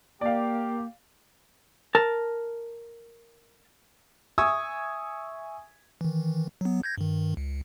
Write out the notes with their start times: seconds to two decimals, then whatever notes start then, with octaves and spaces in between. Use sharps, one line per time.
0.21 A#3 G4 D5 F5
1.95 A#4 A5
4.38 E5 G#5 C#6 D#6 E6 G#6
6.01 D#3 E3
6.61 F#3 B3
6.83 G6 G#6 A#6
6.98 G2 D#3
7.37 C#2